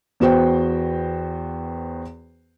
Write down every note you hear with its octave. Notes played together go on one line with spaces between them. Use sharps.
E2 B3 F#4 C5 G5